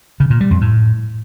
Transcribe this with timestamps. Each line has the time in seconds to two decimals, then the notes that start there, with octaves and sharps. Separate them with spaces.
0.20 C#3
0.30 A#2
0.41 G3
0.51 F2
0.61 A2